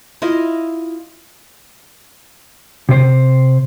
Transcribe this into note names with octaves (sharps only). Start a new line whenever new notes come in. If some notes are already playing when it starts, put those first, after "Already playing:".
E4 F4 D#5
C3 C5